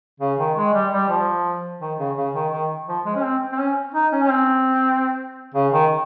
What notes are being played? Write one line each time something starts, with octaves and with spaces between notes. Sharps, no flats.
C#3
D#3
G#3
G3
G3
F3
D#3
C#3
C#3
D#3
D#3
F3
G#3
C#4
C4
C4
C#4
D#4
C#4
C#4
C4
C#3
D#3